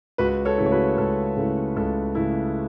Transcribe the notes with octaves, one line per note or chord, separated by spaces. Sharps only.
C#2 F#4 B4
A4 C#5
C#3 A3 E4
C#5
F#4 B4
C#2 A4
C#3 A3 E4
C#2 A4
C#3 A3 E4